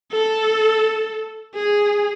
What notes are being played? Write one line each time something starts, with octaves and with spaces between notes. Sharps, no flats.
A4
G#4